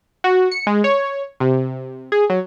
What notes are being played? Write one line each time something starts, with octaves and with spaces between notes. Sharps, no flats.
F#4
C#7
G#3
C#5
C3
G#4
F#3